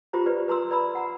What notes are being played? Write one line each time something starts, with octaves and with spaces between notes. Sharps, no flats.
F4 G4 C5 A#5
G4 B4 D5
B4 A#5 C6 E6
B4 D5 A#5 B5 E6
F#5 A#5